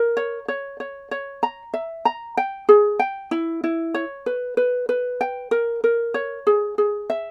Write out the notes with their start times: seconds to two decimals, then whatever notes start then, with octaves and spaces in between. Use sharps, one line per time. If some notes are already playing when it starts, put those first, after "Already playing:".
Already playing: A#4
0.17 C#5
0.48 C#5
0.80 C#5
1.11 C#5
1.43 A#5
1.74 E5
2.05 A#5
2.37 G5
2.69 G#4
2.99 G5
3.31 E4
3.64 E4
3.94 C#5
4.26 B4
4.57 B4
4.89 B4
5.21 G5
5.51 A#4
5.84 A#4
6.14 C#5
6.47 G#4
6.78 G#4
7.10 E5